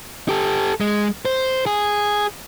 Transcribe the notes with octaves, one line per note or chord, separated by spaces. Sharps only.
G4 A4
G#3
C5
G#4